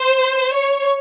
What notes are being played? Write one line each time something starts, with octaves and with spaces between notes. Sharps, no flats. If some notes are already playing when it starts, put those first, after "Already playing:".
Already playing: C5
C#5